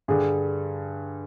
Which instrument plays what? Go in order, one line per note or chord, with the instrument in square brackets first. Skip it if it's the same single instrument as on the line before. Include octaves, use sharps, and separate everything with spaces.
[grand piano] G2 D3 G3 [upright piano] G#4